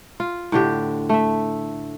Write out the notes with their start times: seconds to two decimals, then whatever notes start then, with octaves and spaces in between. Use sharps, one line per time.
0.20 F4
0.52 A2 D3 G4
1.09 A3 E5